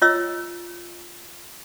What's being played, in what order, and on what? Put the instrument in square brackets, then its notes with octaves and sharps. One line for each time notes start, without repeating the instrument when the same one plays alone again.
[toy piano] F4 C#5 D#5 E6